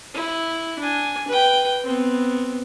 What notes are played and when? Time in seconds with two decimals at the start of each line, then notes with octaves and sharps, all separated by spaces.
0.14 E4
0.79 D4 G#5
1.28 B4 G5
1.84 B3 C4